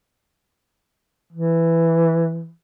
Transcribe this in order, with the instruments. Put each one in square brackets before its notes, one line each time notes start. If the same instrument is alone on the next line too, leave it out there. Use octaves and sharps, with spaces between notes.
[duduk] E3